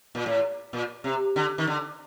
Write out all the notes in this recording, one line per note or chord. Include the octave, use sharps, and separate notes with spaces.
A#2
A2
A#2
C3
D3
D#3
D3